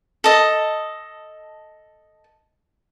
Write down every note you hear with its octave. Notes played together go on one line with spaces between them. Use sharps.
A4 D#5